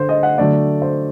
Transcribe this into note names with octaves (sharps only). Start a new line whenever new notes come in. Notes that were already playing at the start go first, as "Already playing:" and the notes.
Already playing: D3 C5
D#5
F#5
D3 F#3 A3 D5
C5